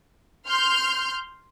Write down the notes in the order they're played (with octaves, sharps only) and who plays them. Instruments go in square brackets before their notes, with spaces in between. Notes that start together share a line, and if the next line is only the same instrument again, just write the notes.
[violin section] C6 F6 G6